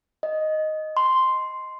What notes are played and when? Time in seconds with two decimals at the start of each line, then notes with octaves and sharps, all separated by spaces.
0.23 D#5
0.97 C6